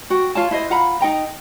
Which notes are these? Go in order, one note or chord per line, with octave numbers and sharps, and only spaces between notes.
F#4 G5
F4 C#5 A5
E4 C5 D#5
F4 F#5 A#5 B5
D#4 D#5 G5 A#5